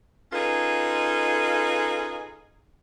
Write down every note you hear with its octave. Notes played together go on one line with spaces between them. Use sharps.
C#4 D#4 F4 G#4 A4 B4